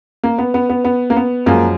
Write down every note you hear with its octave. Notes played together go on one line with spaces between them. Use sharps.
A#3
B3
B3
B3
B3
A#3
B3
F#2 F3 G#3 A#3